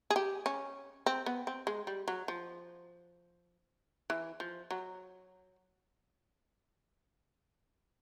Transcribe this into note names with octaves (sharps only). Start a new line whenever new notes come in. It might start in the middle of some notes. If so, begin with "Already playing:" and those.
G#4
G4
C#4
C4
B3
C4
G#3
G3
F#3
F3
E3
F3
F#3